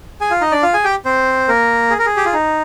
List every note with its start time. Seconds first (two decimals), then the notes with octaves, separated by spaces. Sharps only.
0.21 G#4 G#5
0.30 F4 F5
0.41 D#4 D#5
0.52 D4 D5
0.63 F4 F5
0.74 G#4 G#5
0.84 G4 G5
1.05 C4 C5
1.48 A#3 A#4
1.90 G#4
1.99 A#4
2.06 G#4
2.17 G4
2.25 F4
2.33 D#4